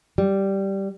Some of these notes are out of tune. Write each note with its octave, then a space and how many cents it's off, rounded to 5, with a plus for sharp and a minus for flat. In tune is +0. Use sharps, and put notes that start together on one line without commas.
G3 -5